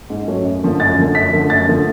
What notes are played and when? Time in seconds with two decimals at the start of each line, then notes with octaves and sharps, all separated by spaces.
0.10 G#2
0.27 F#3 A3 C#4
0.45 F#2
0.63 D3 F3 A3
0.80 F#2 A6
0.98 D3 F3 A3
1.15 F#2 B6
1.33 D3 F3 A3
1.50 F#2 A6
1.68 D3 F3 A3